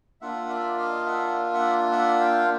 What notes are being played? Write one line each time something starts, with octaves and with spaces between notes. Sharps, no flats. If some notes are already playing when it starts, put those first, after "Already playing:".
A#3 D4 F4 E5 F#5
D5 E5
D#5 F5
E5 F#5
E5 F#5
E5 F#5
F5 G5